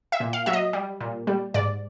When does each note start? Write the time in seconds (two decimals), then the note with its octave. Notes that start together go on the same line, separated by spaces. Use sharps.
0.12 E5
0.20 A#2
0.33 F5
0.46 F#3 E5
0.53 D#5
0.73 G3
1.00 A#2
1.27 G3
1.54 G#2 D5